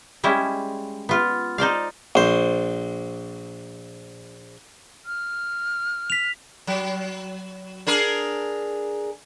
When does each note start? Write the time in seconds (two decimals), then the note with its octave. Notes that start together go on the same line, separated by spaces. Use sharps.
0.24 G3 G#3 C#4 E4
1.09 B3 F4
1.58 D#4 C5 D5 F5
2.15 A#1 C5
5.06 F6
6.10 B6 F7
6.67 F#3
7.87 D4 G#4 A#4